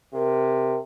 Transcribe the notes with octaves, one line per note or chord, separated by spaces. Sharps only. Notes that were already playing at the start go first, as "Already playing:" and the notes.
C3 A#4